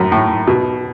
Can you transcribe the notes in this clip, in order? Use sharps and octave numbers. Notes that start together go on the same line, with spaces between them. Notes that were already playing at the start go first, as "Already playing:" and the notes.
Already playing: F#2 A2
A2
B2